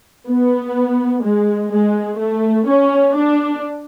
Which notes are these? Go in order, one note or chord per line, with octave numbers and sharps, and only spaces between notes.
B3
G#3
G#3
A3
C#4
D4